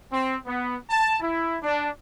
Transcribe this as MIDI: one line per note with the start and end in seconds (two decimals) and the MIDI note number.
0.12 0.36 60
0.46 0.76 59
0.90 1.20 81
1.20 1.57 64
1.62 1.89 62